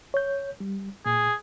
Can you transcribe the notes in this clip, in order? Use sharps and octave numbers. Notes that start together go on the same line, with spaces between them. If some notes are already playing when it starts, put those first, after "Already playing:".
C#5 G6
G3
A#2 G#4